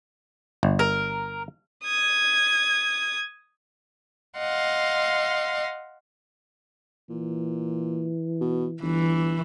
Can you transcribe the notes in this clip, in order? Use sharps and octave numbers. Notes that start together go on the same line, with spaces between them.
G1
A#4
D#6 G#6
D#5 F5 F#5 C6
A#2 E3
B2
G1 E3